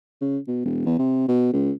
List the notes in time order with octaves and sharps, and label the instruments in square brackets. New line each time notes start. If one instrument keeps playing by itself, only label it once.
[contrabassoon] C#3
B2
E1
E2
C3
B2
C#2